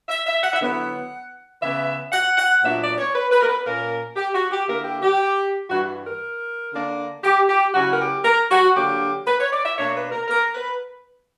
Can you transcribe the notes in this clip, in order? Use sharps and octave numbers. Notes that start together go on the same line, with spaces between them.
E5
E5
F#5
E5
D3 F#3 B3 E4 F#5
C#3 E3 B3 E5
F#5
F#5
A#2 F#3 B3 D4 E5
D5
C#5
B4
B4
A#4
B4
A#2 A#3 C#4 A#4
G4
F#4
G4
D3 A#3 E4 A#4
G4
G4
G2 E3 G3 F#4
A#4
D3 A#3 D4
G4
G4
C#3 F#3 C#4 E4 F#4
A#4
G4
A#4
F#4
D3 F#3 A#3 D4 G4
B4
C#5
D5
E5
B2 A#3 D4 C#5
B4
A#4
A#4
B4